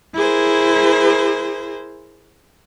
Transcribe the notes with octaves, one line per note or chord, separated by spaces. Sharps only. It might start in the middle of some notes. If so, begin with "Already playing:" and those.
E4 G#4 A#4 C5